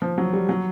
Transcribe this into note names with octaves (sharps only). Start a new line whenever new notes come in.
F3
F#3
G3
F#3